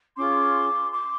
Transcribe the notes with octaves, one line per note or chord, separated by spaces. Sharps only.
C#4 F4 G#4 C6 D6
C6 D6